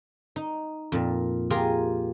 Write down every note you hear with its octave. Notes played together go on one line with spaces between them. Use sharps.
D#4
F2 A#2
F4 G4 G#4 A#4